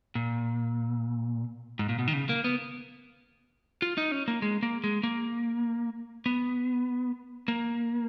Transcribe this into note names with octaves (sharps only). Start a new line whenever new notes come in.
A#2
G#2
A#2
B2
D#3
C#3
A#3
B3
F4
D#4
C#4
A#3
G#3
A#3
G#3
A#3
B3
A#3